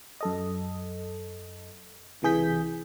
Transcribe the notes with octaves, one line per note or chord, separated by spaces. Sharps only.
F#2 A4 D#5
C#2 C3 E3 G#4 G6 B6